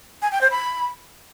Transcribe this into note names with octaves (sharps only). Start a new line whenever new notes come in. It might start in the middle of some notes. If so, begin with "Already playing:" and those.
G#5
G5
C5
B5